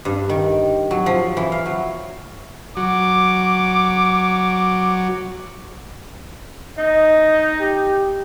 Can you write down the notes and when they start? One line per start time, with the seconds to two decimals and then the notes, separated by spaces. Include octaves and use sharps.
0.05 G2
0.29 D#3
0.91 F#3
1.06 F3
1.37 E3
1.52 F5
1.66 F#3
2.77 F#3 D6
6.78 D#4 D#5
7.60 G4